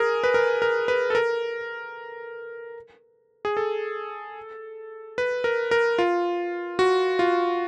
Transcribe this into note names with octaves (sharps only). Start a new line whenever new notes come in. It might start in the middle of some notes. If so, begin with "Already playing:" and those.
Already playing: G#4 A#4
B4
A#4
A#4
B4
A4
A#4
G#4
A4
B4
A#4
A#4
F4
F#4
F4